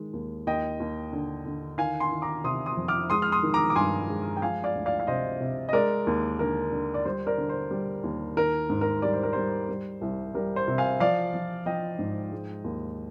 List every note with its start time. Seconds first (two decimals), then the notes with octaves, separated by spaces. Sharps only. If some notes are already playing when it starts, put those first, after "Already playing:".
Already playing: D#3 G#3
0.13 D#2
0.47 D#2 D#5 G5
0.80 D#2
1.13 D3
1.46 D3
1.78 D#3 F5 G#5
2.00 G#5 C6
2.11 D#3
2.22 A#5 D6
2.44 C3 C6 D#6
2.66 C6 D#6
2.77 F2
2.88 D6 F6
3.10 G#3 C6 D#6
3.22 F6
3.32 C6 D#6
3.43 D#3
3.54 A#5 D6
3.70 D6
3.75 G2 G#5 C6
4.10 G#3
4.37 G5
4.42 F3 F5 G#5
4.64 D5 F5
4.75 D2
4.86 D5 F5
5.00 F5
5.07 C3 C5 D#5
5.40 C3
5.69 D#5
5.73 G#3 A#4 D5
6.07 D#2
6.39 D3 A#4
6.72 D3
6.94 D5
7.05 G3 C5
7.27 A#4 D5
7.38 D3
7.49 C5
7.71 G3
8.04 D#2
8.37 D#3 A#4
8.69 G#2
8.81 A#4
9.02 G3 D5
9.13 C5
9.23 A#4
9.33 G3 C5
9.69 G3
10.02 C2
10.35 G3 A#4
10.56 C5
10.68 C3
10.78 F5 G#5
11.00 F3 D5 F5
11.34 F3
11.66 F3 D#5 G5
11.99 G#2
12.32 G#3
12.64 D#2